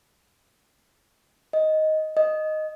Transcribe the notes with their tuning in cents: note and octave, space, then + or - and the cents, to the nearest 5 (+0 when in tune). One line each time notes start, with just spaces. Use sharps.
D#5 +5
D#5 -5